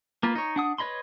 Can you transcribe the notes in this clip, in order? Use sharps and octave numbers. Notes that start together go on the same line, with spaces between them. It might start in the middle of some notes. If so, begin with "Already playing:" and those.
A#3 F4 B4
D#4 C#5
D4 F#5 D#6
B4 C#5 D#5 B5 C6